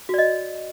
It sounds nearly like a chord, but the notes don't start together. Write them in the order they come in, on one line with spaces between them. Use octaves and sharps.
F#4 D5 D#5